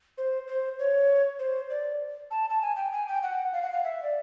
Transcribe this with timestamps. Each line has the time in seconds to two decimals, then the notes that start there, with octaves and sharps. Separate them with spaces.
0.18 C5
0.48 C5
0.79 C#5
1.39 C5
1.70 D5
2.31 A5
2.50 A5
2.61 G#5
2.76 G5
2.92 G#5
3.08 G5
3.23 F#5
3.53 F5
3.62 F#5
3.72 F5
3.84 E5
4.03 D5